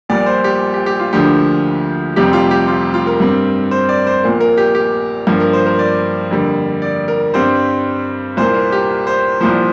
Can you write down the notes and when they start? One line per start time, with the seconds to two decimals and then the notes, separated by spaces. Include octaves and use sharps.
0.09 A#1 A#2 G3 A#3 D5
0.26 C5
0.44 G4
0.74 G4
0.86 G4
1.00 F4
1.13 D2 D3 F3 A#3 G4
2.16 F1 F2 C3 G3 C4 G4
2.33 F4
2.51 G4
2.68 F4
2.94 F4
3.07 A#4
3.20 G2 G3 C4
3.71 C5
3.89 D5
4.07 C5
4.24 A#1 A#2 A#3
4.41 A#4
4.57 G4
4.75 G4
5.27 G2 F3 A#3
5.40 A#4
5.53 C5
5.66 A#4
5.79 D5
6.31 F2 D3 G3 A#3
6.82 D5
7.08 A#4
7.34 G2 G3 C4 C5
8.37 C2 A#2 A#3 C5
8.54 A#4
8.72 G4
9.07 C5
9.41 C2 A#2 F3 C5